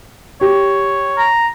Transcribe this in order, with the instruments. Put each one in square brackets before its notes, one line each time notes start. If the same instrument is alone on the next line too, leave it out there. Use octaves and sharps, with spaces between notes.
[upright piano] G4 [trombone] C#5
[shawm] A#5